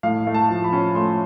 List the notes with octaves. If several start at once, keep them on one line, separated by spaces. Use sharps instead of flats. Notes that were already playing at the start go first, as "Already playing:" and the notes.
A2 F5
A3
A5
F3
B5
C#4
A3 C6